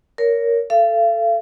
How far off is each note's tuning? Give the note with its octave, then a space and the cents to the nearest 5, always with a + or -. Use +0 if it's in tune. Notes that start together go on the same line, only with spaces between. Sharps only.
A#4 +0 C#5 +25
A4 +0 F5 -40